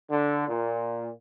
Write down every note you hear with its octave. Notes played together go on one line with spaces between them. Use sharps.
D3
A#2